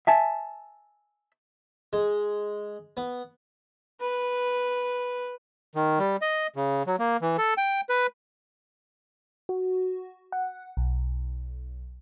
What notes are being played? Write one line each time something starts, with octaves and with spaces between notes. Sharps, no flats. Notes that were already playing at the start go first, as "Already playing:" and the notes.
E5 G#5 A5
G#3
B3
B4
D#3
G3
D#5
C#3
F#3
A#3
E3
A4
G5
B4
F#4
F#5
B1